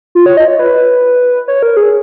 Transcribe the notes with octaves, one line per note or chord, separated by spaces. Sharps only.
F4
C#5
D#5
C#5
B4
C#5
A#4
G#4